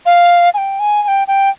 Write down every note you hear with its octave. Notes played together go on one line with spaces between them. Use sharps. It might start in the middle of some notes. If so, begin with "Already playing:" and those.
F5
G#5
G5
G#5
G#5
G5
G5